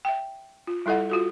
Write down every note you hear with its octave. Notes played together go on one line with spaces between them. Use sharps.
E5 G5
F4
G3 E4 A4 D#5 F#5
F4 F#4 A4